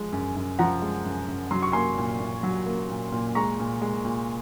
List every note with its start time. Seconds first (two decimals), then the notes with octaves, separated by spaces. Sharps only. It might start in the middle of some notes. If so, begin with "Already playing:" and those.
Already playing: F3 G#3
0.12 F#2
0.36 F#2
0.59 F3 F#5 A#5
0.82 G#3
1.05 F#2
1.28 F#2
1.51 F#3 C6
1.62 C#6
1.72 A#3 G#5 C6
1.98 A#2
2.20 A#2
2.43 F#3
2.66 A#3
2.90 A#2
3.12 A#2
3.35 G#3 A#5 C#6
3.60 A#2
3.82 G#3
4.05 A#2